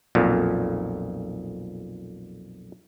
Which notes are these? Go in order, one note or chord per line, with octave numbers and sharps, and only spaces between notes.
B1 F2 A#2